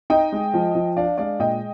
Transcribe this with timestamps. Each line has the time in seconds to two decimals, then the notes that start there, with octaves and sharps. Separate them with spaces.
0.10 D#4 D#5 G5
0.32 G#3
0.54 F3
0.75 F3
0.97 D4 D5 F5
1.18 G#3 D5 F5
1.39 A#2 D#5 G5